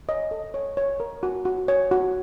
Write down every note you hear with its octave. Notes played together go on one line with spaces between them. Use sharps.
C#5 D#5
A4
C#5
C#5
A#4
F#4
F#4
C#5
F#4